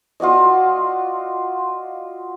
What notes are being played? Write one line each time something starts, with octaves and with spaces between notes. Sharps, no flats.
F4 F#4 D5 D#5